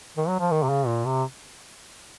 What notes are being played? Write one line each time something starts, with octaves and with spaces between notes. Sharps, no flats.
D#3
F#3
F3
D#3
C3
C#3
A#2
C3